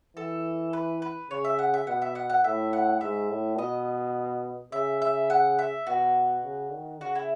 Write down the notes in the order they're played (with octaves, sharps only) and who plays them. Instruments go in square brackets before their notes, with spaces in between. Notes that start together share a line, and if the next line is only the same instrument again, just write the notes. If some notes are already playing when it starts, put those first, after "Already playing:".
[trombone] E3 [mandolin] A4
[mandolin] B4
B4
[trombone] C#3 [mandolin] C#5
[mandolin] E5
F#5
E5
[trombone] B2 [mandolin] F#5
[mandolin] E5
F#5
F#5
[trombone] A2 [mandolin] E5
[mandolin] F#5
[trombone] G#2 [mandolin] E5
[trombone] A2
[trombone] B2 [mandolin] D#5
[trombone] C#3 [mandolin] E5
[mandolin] E5
F#5
E5
[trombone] B2 [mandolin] F#4
[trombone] C#3
D#3
[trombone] C#3 [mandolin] F#4
[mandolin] E4